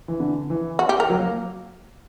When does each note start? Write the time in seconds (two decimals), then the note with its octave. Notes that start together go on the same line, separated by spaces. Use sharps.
0.08 E3
0.20 D3
0.50 E3
0.79 F#4
0.89 G4
1.00 A#4
1.10 F#3
1.20 A#3